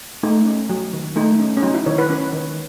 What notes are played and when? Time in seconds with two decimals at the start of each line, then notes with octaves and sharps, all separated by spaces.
0.23 A3 D#4
0.46 C#4
0.69 F#3
0.93 D#3
1.16 A3 D#4
1.39 C#4
1.57 C#4
1.63 F#3 D#4
1.74 E4
1.86 D#3 C#5
1.98 B4
2.10 C#4
2.33 D#3